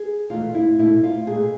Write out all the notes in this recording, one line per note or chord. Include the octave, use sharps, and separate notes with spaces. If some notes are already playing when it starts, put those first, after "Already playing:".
Already playing: G#4
E2 B2 A3 F4
E4
B2 A3 E4
F4
B2 A3 G#4